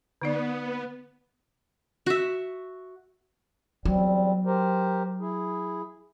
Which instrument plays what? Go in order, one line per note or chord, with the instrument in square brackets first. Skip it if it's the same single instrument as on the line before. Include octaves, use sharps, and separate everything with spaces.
[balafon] D3 D#4 D5 [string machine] B3
[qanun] F#4 E5
[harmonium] E2 G3 C4 [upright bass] F#3
[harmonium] G4 A#4 C5
E4 G#4